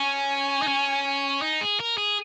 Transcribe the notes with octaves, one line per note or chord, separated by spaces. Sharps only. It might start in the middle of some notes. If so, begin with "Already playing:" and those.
Already playing: C#4 G#5
D#4
C#4
D#4
G#4
A#4
G#4